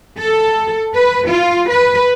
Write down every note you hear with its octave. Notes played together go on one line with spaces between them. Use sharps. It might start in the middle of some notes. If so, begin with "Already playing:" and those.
A4
B4
F4
B4